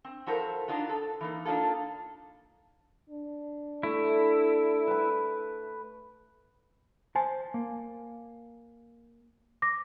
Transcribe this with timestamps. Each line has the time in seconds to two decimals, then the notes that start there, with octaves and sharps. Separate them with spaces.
0.04 C4
0.26 F3 E4 F#4 A4 A#4 C5
0.68 D4 D#4 F4 F#4
0.89 A4
1.21 E3 A#3 D#4
1.45 A#3 D4 D#4 F4 A4
3.10 D4
3.83 A3 E4
4.87 B4 B5
7.15 C5 G#5 A5
7.54 A#3
9.62 D6 A#6